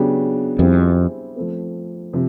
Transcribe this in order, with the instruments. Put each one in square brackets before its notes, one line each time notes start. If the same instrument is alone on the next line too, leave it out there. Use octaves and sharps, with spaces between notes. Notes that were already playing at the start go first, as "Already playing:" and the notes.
Already playing: [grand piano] C#3 F#3 B3 D4 G4
[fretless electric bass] F2 [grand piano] G3 C4 E4 G#4
[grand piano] F3 A3 C4
C3 F3